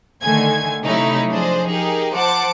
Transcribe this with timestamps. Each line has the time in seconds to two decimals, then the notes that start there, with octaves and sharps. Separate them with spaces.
0.22 D3 D#3 A3 G#5 G#6
0.83 C3 F#3 A3 C#4 D#4 E4
1.31 F3 D4 G#4 C5 D#5
1.69 D#4 G4 G#4 A#4
2.12 F3 C5 F#5 A5 D6